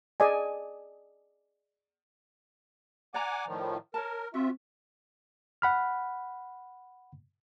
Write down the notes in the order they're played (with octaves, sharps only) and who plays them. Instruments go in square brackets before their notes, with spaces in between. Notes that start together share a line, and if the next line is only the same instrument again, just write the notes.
[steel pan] G#4 D5 D#5 G#5
[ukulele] D5 A#5 [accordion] F#5 G#5 D6
[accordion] A2 D#3 F3
[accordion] A#4 [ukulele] C#5 A5
[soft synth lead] C4 [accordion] F4 E5 [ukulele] F#4
[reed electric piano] F#5 B5 F6